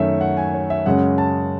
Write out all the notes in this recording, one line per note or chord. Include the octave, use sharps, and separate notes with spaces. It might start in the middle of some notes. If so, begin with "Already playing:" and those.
Already playing: F#2 D#3 A3 C#4 C#5 E5
F#5
G#5
C#5
E5
F#2 C#3 G#3 C#4 F#5
A5